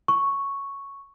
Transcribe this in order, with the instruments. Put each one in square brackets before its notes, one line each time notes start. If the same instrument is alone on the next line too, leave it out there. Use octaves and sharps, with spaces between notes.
[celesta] C#6